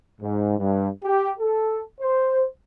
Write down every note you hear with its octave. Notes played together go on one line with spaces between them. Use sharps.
G#2
G2
G4
A4
C5